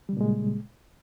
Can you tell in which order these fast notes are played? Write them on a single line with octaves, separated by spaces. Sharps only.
G3 C#3 A#2 G#3